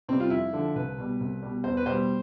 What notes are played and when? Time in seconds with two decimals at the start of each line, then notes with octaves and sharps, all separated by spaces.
0.09 C3 G3 C4
0.20 F4
0.30 F2 E4
0.53 D3 F3
0.75 C2 B4
0.98 B2 G3
1.20 C2
1.43 B2 G3
1.64 E2 C5
1.77 B4
1.86 B2 G3 C5